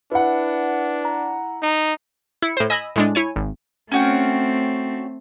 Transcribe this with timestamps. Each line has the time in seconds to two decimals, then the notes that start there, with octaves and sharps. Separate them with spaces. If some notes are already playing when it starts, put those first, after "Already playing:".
0.12 D4 E4 B4 F#5
1.05 A#5
1.63 D#4
2.42 E4 C#7
2.57 A2 C5
2.70 D#5 G#5 B5 E6 A#6 D#7
2.96 A2 G#3 D4
3.15 E4 C#5 G#5
3.36 G#1
3.92 A3 C4 C#4 F#4 G5